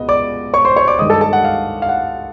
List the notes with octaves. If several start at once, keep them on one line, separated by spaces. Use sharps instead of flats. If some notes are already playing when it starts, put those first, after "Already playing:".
Already playing: C#2 B2 B3 D#5
D5 D6
C#5 C#6
C5 C6
C#5 C#6
D5 D6
G2 D#3 G#3 D#5 D#6
A4 A5
A4 A5
F#5
F5
F5
F#5